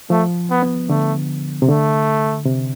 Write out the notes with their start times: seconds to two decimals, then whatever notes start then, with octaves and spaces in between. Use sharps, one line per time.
0.10 F3 A3
0.50 B3
0.63 B3
0.89 D3 A3
1.62 C3
1.68 D3 A3
2.46 C3